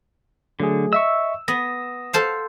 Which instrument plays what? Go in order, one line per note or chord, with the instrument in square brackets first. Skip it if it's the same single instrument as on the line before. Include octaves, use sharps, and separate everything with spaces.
[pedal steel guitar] D3 [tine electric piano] F#3 A3 G#4
[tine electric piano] D#5 E5 C#6 [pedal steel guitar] E6
[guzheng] B3 [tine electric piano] D#6 A#6
[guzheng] A4 C5 F5